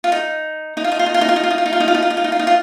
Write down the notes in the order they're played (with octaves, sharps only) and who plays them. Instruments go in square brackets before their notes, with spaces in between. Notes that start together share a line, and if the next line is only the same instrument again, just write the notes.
[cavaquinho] F4
D#4
D#4
F4
D#4
F4
D#4
F4
D#4
F4
D#4
F4
D#4
F4
D#4
F4
D#4
F4
D#4
F4
D#4
F4
D#4
F4
D#4
F4